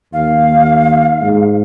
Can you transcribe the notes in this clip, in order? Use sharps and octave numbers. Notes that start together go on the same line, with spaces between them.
D#2 F5
G#2